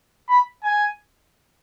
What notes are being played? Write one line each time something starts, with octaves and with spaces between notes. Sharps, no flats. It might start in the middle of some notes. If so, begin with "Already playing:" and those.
B5
G#5